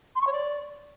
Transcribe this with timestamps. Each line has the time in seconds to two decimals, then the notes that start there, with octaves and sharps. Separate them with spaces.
0.15 C6
0.21 C#6
0.27 C#5
0.33 D5